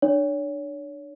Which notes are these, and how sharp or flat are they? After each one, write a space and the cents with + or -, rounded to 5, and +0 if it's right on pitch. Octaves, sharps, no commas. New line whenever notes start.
D4 +25 C#5 +30